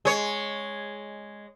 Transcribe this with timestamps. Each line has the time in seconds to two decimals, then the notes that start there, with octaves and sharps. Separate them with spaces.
0.05 G#3 C#5